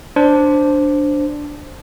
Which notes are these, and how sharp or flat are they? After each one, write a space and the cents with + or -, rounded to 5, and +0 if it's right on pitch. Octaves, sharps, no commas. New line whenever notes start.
D4 +0 C5 +0